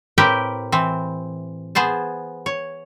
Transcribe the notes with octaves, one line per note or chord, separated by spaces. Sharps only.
A2 C4 G4 A#4 B4 G5
E3 C4
B3 G#4 C5 A5
C#5